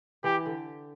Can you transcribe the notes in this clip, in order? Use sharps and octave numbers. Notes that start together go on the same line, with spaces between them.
E3 G4
D3